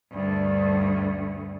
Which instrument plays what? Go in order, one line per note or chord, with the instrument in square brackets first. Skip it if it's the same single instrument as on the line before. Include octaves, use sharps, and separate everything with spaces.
[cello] D2 G2